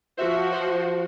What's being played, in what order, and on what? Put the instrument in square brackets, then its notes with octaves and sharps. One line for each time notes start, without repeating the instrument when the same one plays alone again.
[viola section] F3 F#4 [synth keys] C5 E5
[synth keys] C5